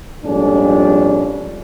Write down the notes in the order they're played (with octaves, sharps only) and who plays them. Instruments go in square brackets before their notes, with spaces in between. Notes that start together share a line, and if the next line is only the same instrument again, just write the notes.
[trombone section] A#1 F2 G#2 G3 C#4 D4